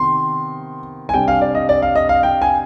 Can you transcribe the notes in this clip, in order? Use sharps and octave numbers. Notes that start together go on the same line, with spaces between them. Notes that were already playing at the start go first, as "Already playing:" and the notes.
Already playing: C3 D#3 B3 C6
G#5
C3 G3 D4 G5
F5
D5
D#5
D5
F5
D#5
F5
G5
G#5